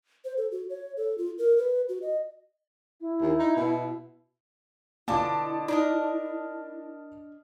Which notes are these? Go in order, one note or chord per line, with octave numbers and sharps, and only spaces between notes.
C5
A4
F#4
C#5
A4
F4
A#4
B4
F#4
D#5
E4
D#2
D#4
B2
B2 D3 A#3 E4 F4 A5 D6
D4 D#4 A#4 D#5